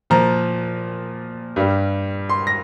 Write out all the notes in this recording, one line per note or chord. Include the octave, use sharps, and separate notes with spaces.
A#2 F3 A#5
G2 G3
C6
A#6